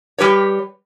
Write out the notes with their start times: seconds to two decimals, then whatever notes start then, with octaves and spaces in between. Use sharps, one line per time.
0.18 G3 G4 B4 C#5